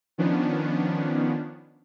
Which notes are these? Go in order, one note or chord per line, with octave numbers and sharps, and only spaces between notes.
D#3 F3 B3 C#4 D4